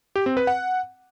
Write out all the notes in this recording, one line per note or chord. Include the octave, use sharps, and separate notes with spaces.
G4
C4
B4
F#5